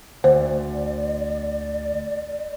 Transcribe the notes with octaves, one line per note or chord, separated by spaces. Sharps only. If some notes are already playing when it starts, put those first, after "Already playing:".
D2 C5 D5